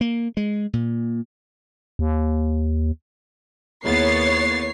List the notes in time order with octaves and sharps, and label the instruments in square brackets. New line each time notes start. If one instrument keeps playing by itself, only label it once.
[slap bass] A#3
G#3
A#2
[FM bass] D#2
[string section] D#2 B3 A6 [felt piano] A#3 E4 G#4 [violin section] C#5 C7